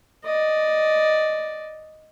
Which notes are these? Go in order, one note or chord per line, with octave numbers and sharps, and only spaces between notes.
D5 D#5